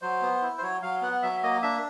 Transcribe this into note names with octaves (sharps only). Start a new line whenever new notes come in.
F#3 C5
B3
E4
C5
F#3 C#5
F#3 F5
B3 F#5
F#3 E5
A#3 D#5
D4 E5